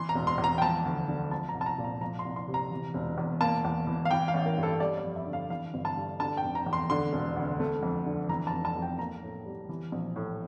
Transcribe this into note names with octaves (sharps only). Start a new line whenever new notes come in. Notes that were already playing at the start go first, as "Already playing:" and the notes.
Already playing: E3 C6
A#5
E1
C6
E2
A#5
G5
F3 A5
D2
D3
F3 A5
A#5
C2
A5
A#5
A#2
A#5
F3 A#5
C6
C2
C6
C3
A#5
E3
E1
E2
A#3 A5
E2
E3
F5
E3 G5
F5
A1
A#4
G2
A4
G3 D5
D5
F2
E5
D3
F5
E3 F5
G1
A5
G2
D3 A5
G5
F1
A#5
E2
C6
D3 C6
E1
D2
A3
F2
D3
E3 A#5
A5
F1
A5
F2
G5
A#3 A#5
A2
G3
E3
A#1
A2